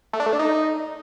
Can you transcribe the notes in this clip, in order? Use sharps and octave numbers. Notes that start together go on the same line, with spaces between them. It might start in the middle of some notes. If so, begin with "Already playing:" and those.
A3
D4
A3
D4
D#4